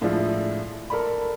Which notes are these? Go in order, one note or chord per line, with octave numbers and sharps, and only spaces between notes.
A2 F3 G#3 D4 E4 F4
A4 A#4 D5 B5